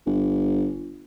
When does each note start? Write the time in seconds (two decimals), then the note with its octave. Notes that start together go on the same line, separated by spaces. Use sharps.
0.06 G1